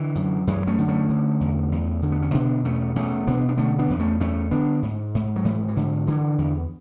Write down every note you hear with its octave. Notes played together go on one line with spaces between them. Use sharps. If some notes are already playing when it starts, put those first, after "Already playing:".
Already playing: D3 E3
F#2
F#2 E3 G#3
A3 C#4
D3
A3 C#4
D3
E2
E2
D3
B3
C#4
B2 B3 D4
E2 A3 C#4
E2 A3 C#4
B2 B3 D4
D4
D3 A3 C#4
B3 D4
E2
A3 C#4
E2 A3 C#4
D3 B3 D4
G#2
G#2
F#3
G#2 E3
E3
G#2 D3
D3 E3
E2